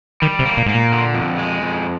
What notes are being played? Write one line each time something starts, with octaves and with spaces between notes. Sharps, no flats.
D#3 G3
C3
A#3
A#2
G#2 A#3
A#2
D3
F2
G#3
F2